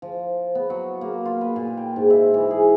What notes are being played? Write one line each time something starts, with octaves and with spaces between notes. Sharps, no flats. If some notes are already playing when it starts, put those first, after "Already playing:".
F3
B3
F#3
A#3
F4
B4
A#2
G5
G#2
E5
E3
G#4